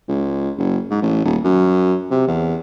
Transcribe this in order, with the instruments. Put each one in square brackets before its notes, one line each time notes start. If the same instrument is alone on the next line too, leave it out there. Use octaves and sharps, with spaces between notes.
[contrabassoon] C#2
F#1
G#2
A1
D#1
F#2
C3
E2